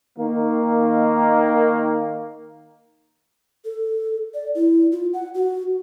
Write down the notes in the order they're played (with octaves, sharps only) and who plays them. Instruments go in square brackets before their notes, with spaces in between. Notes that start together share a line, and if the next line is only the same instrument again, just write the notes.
[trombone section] D#3 A#3
[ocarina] A4
D5
E4
F4
F#5
F#4